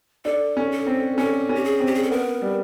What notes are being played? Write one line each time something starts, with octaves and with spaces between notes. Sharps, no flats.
D4 A4
C#4
A4
C4
C#4 A4
C#4
G4
G#4
C4
G4
G#4
A4
B3 A#4
G3